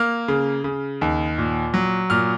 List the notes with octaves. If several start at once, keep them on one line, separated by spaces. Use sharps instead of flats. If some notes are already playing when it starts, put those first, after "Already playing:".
Already playing: A#3 F6
C#3
C#3
D#2
A#2
F#3
A#2 F6